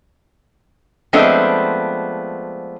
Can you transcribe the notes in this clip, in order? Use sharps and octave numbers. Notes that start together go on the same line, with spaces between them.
F3 G#3 A3 B3 C4 D4